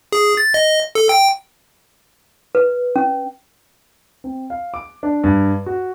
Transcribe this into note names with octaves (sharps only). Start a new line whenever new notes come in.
G#4
A6
D#5
A4
G5
B4
C#4
C4
F5
D6
D4
G2
F#4